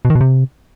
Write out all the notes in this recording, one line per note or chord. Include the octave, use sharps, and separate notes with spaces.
B2
D#3
B2
C3